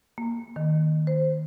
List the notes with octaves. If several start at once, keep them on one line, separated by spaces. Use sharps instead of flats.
A#3
D#3
C5